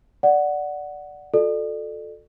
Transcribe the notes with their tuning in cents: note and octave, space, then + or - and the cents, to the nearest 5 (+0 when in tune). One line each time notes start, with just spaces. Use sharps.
D5 +0 F#5 +0
F#4 -40 A4 +0 D5 +30